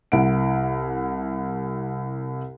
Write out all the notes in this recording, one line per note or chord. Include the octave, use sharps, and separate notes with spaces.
C2 E4 F#5 D7